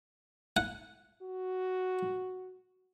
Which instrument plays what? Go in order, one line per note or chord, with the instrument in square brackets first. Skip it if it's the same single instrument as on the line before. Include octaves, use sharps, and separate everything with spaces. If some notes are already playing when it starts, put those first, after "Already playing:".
[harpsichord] F#5
[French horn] F#4